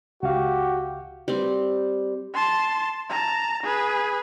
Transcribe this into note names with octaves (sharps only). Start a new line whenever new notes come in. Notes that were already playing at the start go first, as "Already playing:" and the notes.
C#2 F#4 G4 F5
G3 C4
A5 C6
A5 A#5
G#4 B4